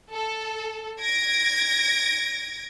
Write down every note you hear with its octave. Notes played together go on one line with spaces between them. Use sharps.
A4
G#6 A#6 D7